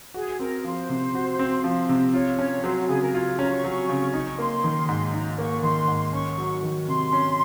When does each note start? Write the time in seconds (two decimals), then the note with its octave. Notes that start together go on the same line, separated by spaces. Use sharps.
0.14 F#4 G#4
0.39 C4 A#4
0.64 F3 C5
0.89 C3
1.15 F#4
1.39 C4
1.64 F3
1.89 C3
2.14 F4 C#5
2.39 C#4
2.64 F#3 C5
2.76 F#4
2.88 C#3 G#4
3.02 A#4
3.14 F4 C#5
3.26 C#5
3.38 C#4 A#5
3.51 C#6
3.64 F#3
3.89 C#3
4.13 D#4 C#6
4.38 A#3 C6
4.64 D#3
4.89 G#2
5.13 D#4 A#5
5.38 A#3 C#6
5.63 D#3 C6
5.88 G#2
6.13 C#4 C#6
6.38 F#3
6.63 D#3
6.88 C3 C6
7.13 C#4